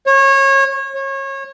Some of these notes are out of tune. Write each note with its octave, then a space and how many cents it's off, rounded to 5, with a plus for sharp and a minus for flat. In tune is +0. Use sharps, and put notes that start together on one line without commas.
C#5 -25
C#5 -30